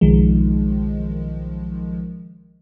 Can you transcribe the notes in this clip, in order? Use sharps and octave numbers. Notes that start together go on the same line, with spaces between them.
B1 D#3 F3 G#3